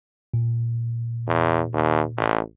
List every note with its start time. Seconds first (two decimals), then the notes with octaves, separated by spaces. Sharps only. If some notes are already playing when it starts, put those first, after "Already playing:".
0.34 A#2
1.27 E2
1.73 D#2
2.17 A1